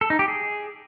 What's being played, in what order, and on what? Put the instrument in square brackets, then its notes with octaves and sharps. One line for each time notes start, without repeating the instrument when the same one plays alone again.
[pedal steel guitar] A4
D#4
G4
G#4